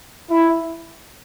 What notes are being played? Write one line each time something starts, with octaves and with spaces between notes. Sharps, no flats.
E4